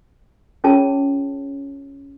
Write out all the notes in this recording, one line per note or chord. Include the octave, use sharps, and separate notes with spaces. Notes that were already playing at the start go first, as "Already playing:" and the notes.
C#4 F4 G#4 C#5 A5